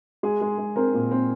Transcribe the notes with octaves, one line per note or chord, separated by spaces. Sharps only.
G#3 G#4
G#3
G#3
C4 A#4
A#2
C4